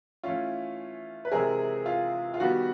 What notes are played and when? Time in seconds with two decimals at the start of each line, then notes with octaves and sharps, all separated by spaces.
0.24 E3 A3 C#4 F4
1.25 B4
1.31 C3 E3 G#3 C4 G#4 A#4
1.86 F4
2.34 F4
2.40 D#3 G3 B3 F#4